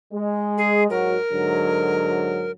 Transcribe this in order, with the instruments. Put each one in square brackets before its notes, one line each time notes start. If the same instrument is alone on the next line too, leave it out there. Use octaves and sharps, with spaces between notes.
[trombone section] G#3
[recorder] G#4
[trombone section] G#2 F#3 F#4 [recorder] A#4
[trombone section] G#2 D3 F#3